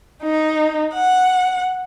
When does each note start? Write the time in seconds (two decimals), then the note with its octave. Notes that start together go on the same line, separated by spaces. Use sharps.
0.24 D#4
0.93 F#5